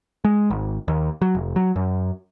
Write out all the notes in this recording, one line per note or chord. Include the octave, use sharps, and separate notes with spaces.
G#3
G#1
D#2
F#3
F1
F#3
F#2